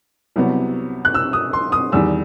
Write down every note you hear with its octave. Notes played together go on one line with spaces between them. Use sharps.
C2 C3 F#3 B3
F#6
E6
D#6
C6
D#6
E2 D#3 G3 E6